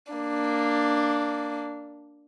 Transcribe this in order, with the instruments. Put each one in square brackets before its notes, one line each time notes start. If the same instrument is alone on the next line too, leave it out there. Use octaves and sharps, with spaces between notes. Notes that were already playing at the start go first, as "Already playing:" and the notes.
[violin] A#3 D4